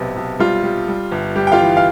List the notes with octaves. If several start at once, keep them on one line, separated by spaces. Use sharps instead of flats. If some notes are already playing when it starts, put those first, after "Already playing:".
Already playing: B1 C3 B3
B1
G3 F4
G3
G3
G1
G3 G4
G5
F4 F5
E3
F5